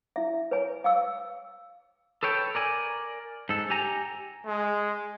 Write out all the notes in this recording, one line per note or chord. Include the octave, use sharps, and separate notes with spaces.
E4 E5
B4 C#5 G#5
F5 G5 E6
A4 B4 C#5 G5
A#4 D5 G#5
G#2 A4
G4 G#5 A#5
G#3